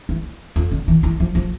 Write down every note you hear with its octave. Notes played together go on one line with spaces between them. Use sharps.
E3
F2
D3
E3
E3
F3
F3